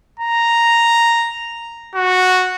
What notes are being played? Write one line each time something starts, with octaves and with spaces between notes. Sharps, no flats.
A#5
F#4